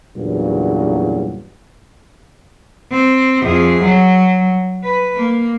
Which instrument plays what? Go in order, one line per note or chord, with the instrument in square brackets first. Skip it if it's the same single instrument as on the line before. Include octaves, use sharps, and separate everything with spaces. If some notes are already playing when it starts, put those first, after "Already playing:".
[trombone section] E2 G2 A#2 C#3 F#3
[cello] C4
F2 G#4
F#3
B4
A#3